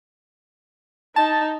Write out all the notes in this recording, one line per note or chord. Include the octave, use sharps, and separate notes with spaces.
D#4 A5